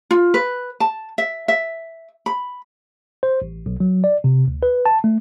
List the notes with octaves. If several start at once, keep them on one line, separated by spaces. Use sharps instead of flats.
F4
B4
A5
E5
E5
B5
C5
A1
B1
F#3
D5
C3
D2
B4
A5
A3